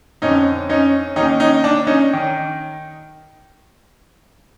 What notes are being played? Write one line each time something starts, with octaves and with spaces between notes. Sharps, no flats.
F2 D3 C#4 D#4
C#4 D#4
D#2 D#3 C#4 D#4
C#4 D#4
D4
C#4 D#4
D#3